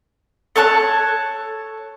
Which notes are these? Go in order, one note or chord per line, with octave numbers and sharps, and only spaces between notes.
A4 C#5 A5 F#6